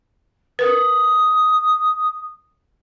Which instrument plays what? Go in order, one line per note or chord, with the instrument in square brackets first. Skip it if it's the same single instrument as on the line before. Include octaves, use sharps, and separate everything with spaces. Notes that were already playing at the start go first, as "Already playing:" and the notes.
[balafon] A#4 B4 [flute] D#6